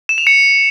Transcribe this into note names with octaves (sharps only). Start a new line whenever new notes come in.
E7
F7
C#7